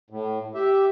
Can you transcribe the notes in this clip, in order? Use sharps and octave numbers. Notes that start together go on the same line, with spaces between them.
A2
G4 E5